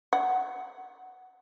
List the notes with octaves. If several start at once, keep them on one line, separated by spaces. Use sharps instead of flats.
F#5